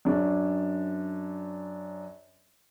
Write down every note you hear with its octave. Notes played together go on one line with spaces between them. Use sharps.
F#2 C#4 D4